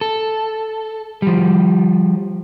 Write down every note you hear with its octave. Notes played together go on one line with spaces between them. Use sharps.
A4
F3 G3